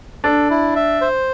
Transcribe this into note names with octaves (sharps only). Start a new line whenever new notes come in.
D4 A4
E4
E5
C5